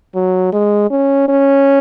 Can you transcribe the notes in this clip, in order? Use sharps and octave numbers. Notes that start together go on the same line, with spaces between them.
F#3
G#3
C#4
C#4